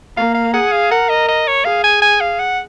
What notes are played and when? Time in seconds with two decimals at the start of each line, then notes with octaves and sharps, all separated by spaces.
0.17 A#3 F5
0.35 F5
0.54 G#4 F#5
0.72 F5
0.91 A#4 F#5
1.09 D#5
1.28 D#5
1.47 C#5
1.65 G#4 F5
1.84 G#5
2.02 G#5
2.21 F5
2.40 F#5